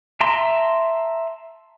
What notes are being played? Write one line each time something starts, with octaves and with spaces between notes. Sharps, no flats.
E5 A5 A#5 C6